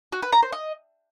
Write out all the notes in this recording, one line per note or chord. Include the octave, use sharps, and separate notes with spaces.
F#4
B4
A#5
C5
D#5